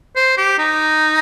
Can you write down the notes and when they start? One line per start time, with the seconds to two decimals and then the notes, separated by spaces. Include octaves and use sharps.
0.16 C5
0.37 G4
0.59 D#4